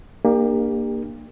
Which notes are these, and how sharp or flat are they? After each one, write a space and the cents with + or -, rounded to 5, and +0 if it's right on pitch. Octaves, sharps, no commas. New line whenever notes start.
A#3 +0 D4 +35 G4 +30